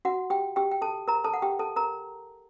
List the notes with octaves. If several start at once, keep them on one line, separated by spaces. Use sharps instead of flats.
F#4 F#5
G4 G5
G4 G5
G5
A4 A5
A#4 A#5
A4 A5
F#5
G4 G5
A4 A5
A#4 A#5